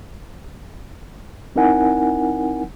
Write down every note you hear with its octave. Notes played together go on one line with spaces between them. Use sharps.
C4 D#4 E4 A#4 F#5 G#5